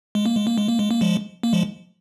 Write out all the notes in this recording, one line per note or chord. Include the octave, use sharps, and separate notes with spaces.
G#3
A#3
G#3
A#3
G#3
A#3
G#3
A#3
F3 G#3
A#3
F3 G#3